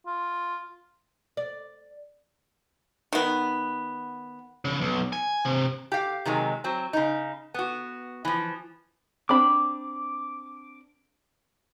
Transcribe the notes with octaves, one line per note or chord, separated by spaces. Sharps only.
F4
D5
D#3 B3
C#3
B1
G#5
C3
G4 F5
C3 D#3 F#3 G#3
F#3 C4
C#3 D#4
B3 F#4
E3 F3
C4 D4 B5 D6